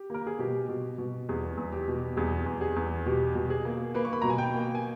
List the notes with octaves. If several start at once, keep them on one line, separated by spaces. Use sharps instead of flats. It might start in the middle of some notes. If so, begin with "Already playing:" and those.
Already playing: G4
A#3 A#4
G#4
B2 G4
B2
B2
E2 G#4
E2
G4
B2
E2 G#4
E2
G#4
E2
B2 G4
B2
G#4
A#3
A#3 B4
C#6
B5
B2 A#5
G#5
G5
A#3
G#5